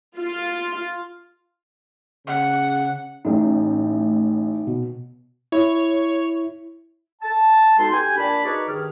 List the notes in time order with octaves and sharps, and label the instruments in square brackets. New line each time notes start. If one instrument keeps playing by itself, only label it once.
[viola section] F4
[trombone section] C#3 [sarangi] F#5
[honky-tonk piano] A1 A2 [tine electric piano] D#4
[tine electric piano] B2
[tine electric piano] E4 [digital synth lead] C#5
[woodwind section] A5
B2 G#3 D#4 A4 C6
G4 A4 G5 G#5
A#2 D4 D5 A5 B5
D#4 F#4 G#4 B4 C#5 D5
G2 D#3 G#4 F6